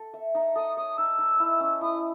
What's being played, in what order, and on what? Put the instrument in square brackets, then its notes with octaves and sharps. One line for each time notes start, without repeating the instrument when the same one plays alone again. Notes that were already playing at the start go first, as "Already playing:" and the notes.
Already playing: [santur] A4
E5
D#4
[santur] A4 [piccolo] D#6
[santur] C#5 [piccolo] D#6
[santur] D#4 [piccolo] E6
[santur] D#4
E4
C#4
[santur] E4 [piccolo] D#6